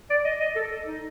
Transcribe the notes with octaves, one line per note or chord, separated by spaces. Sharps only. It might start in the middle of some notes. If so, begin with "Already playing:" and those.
D5
D#5
D#5
A4
D#4